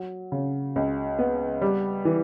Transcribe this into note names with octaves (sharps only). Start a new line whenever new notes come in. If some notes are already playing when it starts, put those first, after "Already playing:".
Already playing: F#3
C#3
C#2
B3
G3
E3